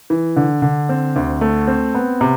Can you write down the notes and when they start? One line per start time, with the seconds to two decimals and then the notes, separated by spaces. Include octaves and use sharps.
0.10 E3
0.36 D3
0.62 D3
0.89 C4
1.16 D2
1.41 A3
1.68 C4
1.95 B3
2.21 C3